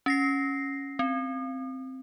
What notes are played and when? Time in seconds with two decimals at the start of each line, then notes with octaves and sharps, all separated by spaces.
0.06 C#4 A#6 C7
0.99 C4